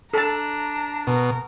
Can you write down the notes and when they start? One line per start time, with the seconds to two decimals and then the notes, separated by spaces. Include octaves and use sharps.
0.14 D4 A4 A5 A#5
1.07 B2 A#4